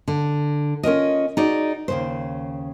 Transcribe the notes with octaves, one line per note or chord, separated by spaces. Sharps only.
D3
C#4 F4 A#4 D#5
D#4 F#4 G#4 D5
D#2 C#3 C5